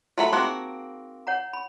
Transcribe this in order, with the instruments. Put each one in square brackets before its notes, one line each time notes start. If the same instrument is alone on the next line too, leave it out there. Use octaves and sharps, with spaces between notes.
[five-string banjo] F#3 A3 B5 [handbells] F4 A#5
[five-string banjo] A#3 C4 F#4 [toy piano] D#4 G#4 A#5 [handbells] C6 F#6
[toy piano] C#5 F#5 A#5
B5